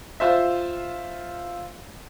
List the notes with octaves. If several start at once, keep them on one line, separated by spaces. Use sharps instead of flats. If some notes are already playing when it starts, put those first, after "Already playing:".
F4 C5 E5